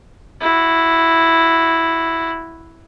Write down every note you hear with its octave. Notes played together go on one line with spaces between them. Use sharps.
E4 F#4